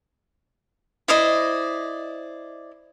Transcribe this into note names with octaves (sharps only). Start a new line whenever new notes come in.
E4 C5 D5 D#5